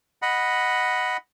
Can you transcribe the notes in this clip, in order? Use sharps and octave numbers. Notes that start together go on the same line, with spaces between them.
D#5 F#5 B5